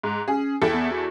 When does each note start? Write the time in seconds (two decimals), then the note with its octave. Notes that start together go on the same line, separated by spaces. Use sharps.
0.03 G#2 A#5
0.28 C#4 G#4
0.62 E2 E4 A4 G5
0.74 B3
0.91 F#4